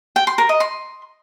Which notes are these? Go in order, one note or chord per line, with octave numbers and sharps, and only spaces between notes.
G5
C6
A#4
D#5
C6